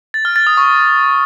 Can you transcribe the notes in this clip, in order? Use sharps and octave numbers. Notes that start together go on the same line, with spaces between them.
A6
F6
A6
D#6
C#6